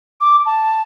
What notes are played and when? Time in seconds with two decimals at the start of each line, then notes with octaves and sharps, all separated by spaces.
0.21 D6
0.46 A5